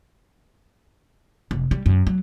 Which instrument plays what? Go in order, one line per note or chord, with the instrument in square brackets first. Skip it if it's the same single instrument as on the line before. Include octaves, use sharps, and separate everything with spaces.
[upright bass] F1
G3
F#2
F#3